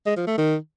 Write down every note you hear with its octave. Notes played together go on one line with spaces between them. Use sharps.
G#3
F3
A3
D#3